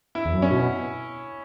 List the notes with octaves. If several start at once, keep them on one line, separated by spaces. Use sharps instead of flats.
E4
E2
F#2
C#4
B2